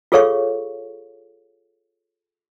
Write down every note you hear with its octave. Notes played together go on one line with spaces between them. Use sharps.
F4 G#4 A4 C#5 F5 C#6